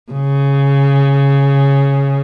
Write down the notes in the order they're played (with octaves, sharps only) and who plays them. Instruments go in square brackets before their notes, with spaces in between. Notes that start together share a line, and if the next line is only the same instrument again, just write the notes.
[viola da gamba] C#3